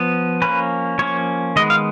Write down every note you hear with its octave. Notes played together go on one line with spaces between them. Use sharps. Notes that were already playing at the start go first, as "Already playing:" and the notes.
Already playing: F3 B3
F3 A#3 C#4 B4
F3 A#3 C#4 C#5
D#3 G#3 B3 D#5
F5